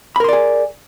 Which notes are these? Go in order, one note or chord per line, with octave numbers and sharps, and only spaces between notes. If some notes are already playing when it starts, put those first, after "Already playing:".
G#4 A#4 D5 B5 C6